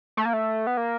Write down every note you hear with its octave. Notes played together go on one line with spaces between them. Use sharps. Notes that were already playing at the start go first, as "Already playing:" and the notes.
A3
A#3
A3
B3
A#3